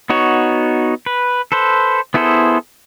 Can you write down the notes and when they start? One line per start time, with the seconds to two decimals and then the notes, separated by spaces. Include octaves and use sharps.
0.10 B3 D#4 F#4 C#5
1.06 B4
1.52 A4 B4 C5
2.14 B3 E4 G#4 A4 C5